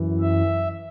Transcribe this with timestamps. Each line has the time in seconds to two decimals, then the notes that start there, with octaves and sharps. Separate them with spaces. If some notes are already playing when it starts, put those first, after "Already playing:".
Already playing: F#2 E3
0.21 E5